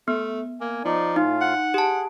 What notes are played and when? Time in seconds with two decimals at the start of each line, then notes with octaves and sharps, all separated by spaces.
0.08 A3 B3
0.61 A#3 G#5
0.85 F3 D#4 D5
1.16 A2 D#4 F4 F5
1.41 F#5
1.74 G4 G#4 A5